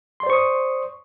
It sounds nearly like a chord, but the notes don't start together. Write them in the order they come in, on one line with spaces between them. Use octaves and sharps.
C6 D5 C5 C#6 D#6